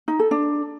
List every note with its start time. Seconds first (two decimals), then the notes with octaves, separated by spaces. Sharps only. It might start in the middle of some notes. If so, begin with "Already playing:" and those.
0.08 D#4
0.19 A4
0.31 D4